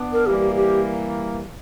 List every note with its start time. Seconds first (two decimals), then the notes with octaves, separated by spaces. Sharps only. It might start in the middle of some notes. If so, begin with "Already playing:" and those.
Already playing: B3 D4
0.13 A#4
0.26 E3 G3 A#3 G4
0.55 G4